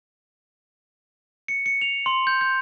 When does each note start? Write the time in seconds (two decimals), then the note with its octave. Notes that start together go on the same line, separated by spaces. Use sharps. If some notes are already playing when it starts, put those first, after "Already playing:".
1.48 C#7
1.66 C#7
1.81 F7
2.06 C6
2.27 G6
2.41 G6